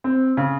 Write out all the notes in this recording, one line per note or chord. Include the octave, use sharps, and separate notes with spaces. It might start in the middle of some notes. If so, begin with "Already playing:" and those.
C4
C#3